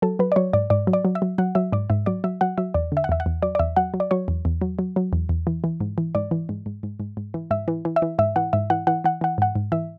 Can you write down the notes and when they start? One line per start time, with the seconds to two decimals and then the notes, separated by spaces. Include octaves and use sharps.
0.02 F#3 A4
0.19 F#3 B4
0.32 D5
0.36 F#3 C#5
0.53 G#2 D5
0.70 G#2 D5
0.87 F#3
0.93 D5
1.05 F#3
1.15 E5
1.22 F#3
1.38 F#3 F#5
1.55 F#3 E5
1.73 G#2 D5
1.90 G#2 E5
2.06 F#3 D5
2.24 F#3 E5
2.41 F#3 F#5
2.58 F#3 E5
2.74 E2 D5
2.92 D3 E5
3.04 F#5
3.09 E2 E5
3.20 F#5
3.26 E2
3.43 F#3 D5
3.55 D5
3.59 E2 E5
3.77 F#3 F#5
3.94 F#3
4.00 D5
4.11 F#3 C#5
4.28 E2
4.45 E2
4.62 F#3
4.79 F#3
4.96 F#3
5.13 E2
5.29 E2
5.47 E3
5.64 E3
5.80 G#2
5.98 E3
6.15 G#2 D5
6.31 E3
6.49 G#2
6.66 G#2
6.83 G#2
7.00 G#2
7.17 G#2
7.34 E3
7.51 G#2 E5
7.68 E3
7.85 E3
7.96 E5
8.02 E3
8.19 G#2 E5
8.36 E3 F#5
8.53 G#2 E5
8.70 E3 F#5
8.87 E3 F#5
9.04 E3 F#5
9.21 E3 F#5
9.38 G#2 F#5
9.56 G#2
9.72 E3 E5